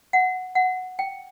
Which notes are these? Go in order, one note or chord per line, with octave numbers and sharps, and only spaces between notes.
F#5
F#5
G5